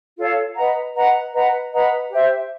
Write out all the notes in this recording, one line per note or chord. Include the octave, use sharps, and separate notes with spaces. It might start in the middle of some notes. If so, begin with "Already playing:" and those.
F4 A4 C#5 F5
B4 D#5 F#5 A#5
B4 D#5 F#5 A#5
B4 D#5 F#5 A#5
B4 D#5 F#5 A#5
G4 C5 E5